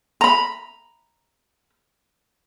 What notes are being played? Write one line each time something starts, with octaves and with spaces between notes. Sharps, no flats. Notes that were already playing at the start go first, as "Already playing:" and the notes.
A#5 B5